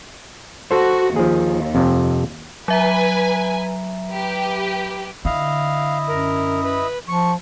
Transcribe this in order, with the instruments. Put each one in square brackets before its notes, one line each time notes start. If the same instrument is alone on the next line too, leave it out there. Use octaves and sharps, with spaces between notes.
[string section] F#4 [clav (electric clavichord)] A4 C5
[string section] D#2 [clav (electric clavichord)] F3 G#4
[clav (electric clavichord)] F2 C3
[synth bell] F#3 E5 A#5 [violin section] B4 G#5
[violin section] G4 B4
[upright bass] D3 [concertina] E4 D#5 [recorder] F5
[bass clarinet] F#2 [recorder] A#4
[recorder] B4
[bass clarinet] F3 [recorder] C#6